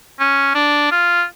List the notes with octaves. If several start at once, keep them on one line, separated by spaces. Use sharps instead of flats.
C#4
D4
F4